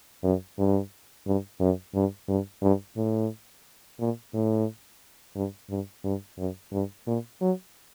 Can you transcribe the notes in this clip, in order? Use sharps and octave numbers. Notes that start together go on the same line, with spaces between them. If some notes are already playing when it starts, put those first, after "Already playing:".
F#2
G2
G2
F#2
G2
G2
G2
A2
A#2
A2
G2
G2
G2
F#2
G2
A#2
F#3